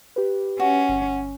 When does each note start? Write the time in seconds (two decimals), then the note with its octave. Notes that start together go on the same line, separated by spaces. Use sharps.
0.16 G4 B4
0.60 C#4 F#4
0.89 G1